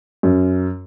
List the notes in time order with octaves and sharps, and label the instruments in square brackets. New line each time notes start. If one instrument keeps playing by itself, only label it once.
[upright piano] F#2